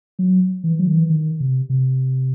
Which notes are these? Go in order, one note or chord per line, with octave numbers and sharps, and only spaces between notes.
F#3
E3
F#3
D#3
E3
D#3
C3
C3